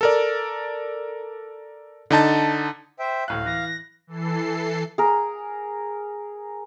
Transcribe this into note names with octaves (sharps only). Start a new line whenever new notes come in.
A4 A#4 D5
D3 D#4 A5 A6
C5 E5 G5
D1 A2 F5 F#6
E3 A#6
E3 A4 C7
G#4 A#4